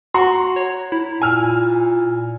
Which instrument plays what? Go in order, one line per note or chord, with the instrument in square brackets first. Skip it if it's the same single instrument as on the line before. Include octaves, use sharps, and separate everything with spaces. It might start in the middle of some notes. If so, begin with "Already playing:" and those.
[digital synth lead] F#4 [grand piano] F#5 A#5 C6
[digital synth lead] C#5
E4
[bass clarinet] A#2 [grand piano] G#5 E6 F6